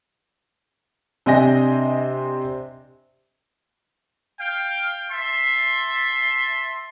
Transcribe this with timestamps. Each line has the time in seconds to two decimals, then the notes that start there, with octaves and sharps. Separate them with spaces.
1.26 C3 C4 D4 D#5 G#5 A#6
4.40 F5 G5
5.12 E5 A5 C6